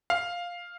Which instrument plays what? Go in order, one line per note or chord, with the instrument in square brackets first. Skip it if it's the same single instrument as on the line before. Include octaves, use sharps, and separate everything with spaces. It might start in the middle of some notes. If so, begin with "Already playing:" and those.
[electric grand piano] F5